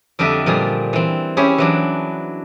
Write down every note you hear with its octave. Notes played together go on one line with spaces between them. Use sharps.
F2 D3 G3 D4 D#5 E5
A#2 F3 G3 G#4
E3 C4
C#4 E4 G4 G#4
E3 F#3 D4